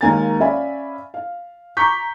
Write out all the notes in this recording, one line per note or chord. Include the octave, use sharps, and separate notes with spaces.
D#2 G#3 A#3 G#5 A#5 A6
C#4 D5 E5 F5 G#5 B5
F5
A#5 C#6 D6 G6 B6